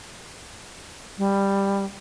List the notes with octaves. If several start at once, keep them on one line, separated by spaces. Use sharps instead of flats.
G3